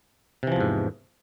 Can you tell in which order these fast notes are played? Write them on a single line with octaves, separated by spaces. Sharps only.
C3 E3 F3 E2 G#2